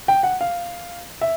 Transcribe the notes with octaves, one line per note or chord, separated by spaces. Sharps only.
G5
F#5
F5
E5